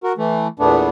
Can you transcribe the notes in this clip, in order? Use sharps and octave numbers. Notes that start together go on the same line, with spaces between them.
F#4 A#4
E3 A3
E2 A#2 A3 B3 D4